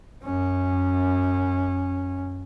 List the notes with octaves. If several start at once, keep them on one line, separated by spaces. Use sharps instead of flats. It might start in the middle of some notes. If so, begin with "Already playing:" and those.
F#2 C#4